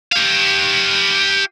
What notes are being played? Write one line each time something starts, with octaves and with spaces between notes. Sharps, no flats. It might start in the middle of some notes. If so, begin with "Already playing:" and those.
G4 F5